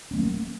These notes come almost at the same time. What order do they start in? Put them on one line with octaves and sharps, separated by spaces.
C#4 A3 F#3 A#3